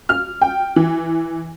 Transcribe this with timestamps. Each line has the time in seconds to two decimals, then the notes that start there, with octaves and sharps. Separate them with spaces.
0.09 F6
0.42 G5
0.76 E3